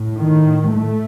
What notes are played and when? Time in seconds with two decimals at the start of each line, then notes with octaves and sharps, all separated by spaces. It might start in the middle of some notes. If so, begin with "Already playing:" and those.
Already playing: A2
0.18 D#3
0.74 A3